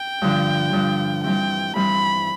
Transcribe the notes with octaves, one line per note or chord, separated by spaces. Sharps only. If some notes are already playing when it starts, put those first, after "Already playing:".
Already playing: G5
G2 D3 F3
G2 D3 F3
G2 E3 G3 C4 G5
G2 E3 G3 C4 B5